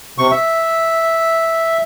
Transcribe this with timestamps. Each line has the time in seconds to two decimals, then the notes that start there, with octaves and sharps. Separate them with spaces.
0.18 C3 C#6
0.31 E5